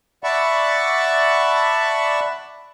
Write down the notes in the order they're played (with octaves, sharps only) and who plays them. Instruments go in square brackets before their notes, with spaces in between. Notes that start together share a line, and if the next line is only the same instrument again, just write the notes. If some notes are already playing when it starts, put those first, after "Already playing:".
[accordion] D5 E5 F#5 A5 B5 C#6